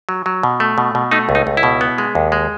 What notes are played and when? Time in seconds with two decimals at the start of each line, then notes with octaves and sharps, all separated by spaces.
0.09 F#3
0.26 F#3
0.43 B2
0.60 A3
0.78 B2
0.95 B2
1.11 A3 D#4
1.29 C#2
1.35 D#4
1.47 C#2
1.57 E4
1.63 B2
1.81 B3
1.98 G#3
2.15 D#2
2.32 G#3